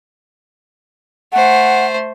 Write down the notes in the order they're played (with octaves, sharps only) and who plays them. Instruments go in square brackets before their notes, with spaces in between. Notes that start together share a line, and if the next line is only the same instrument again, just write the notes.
[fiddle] A3 C5 [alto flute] F#5